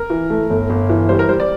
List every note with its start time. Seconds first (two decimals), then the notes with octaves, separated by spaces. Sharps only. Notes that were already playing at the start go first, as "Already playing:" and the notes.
Already playing: A#4
0.10 E3
0.30 A3
0.50 G1
0.70 G1
0.90 E3
1.09 G3 C5
1.19 A#4
1.29 G3 C5
1.40 D5